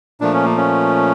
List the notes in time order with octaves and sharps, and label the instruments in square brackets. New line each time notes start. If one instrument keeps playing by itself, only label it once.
[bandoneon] A#2 F3 A3 D4
C#4
A#3
C#4